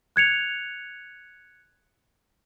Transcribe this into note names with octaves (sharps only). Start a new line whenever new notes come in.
F#6 G#6 C#7 F7